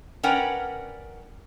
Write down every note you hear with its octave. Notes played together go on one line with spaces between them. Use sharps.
C#4 A#4 B4 D5 F#5 G5